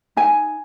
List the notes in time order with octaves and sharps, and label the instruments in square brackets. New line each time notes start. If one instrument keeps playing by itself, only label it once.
[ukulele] D#4 G#5